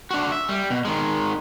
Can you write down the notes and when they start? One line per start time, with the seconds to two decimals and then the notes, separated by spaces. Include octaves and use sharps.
0.11 D4 F#4
0.32 E5
0.48 G3
0.70 B2
0.85 D#3 G#3